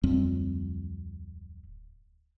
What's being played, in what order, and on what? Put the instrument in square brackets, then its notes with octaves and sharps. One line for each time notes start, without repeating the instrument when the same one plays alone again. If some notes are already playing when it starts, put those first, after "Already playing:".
[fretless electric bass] D1 F2 G3 C4